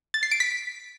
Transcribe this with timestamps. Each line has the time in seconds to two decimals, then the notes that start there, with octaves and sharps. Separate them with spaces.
0.14 A6
0.23 C7
0.31 D7
0.40 B6